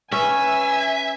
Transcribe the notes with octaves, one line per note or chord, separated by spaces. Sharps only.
C#4 B4 E5 G#5